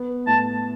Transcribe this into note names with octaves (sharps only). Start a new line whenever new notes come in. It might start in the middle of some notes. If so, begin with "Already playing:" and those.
Already playing: B3
A2 A5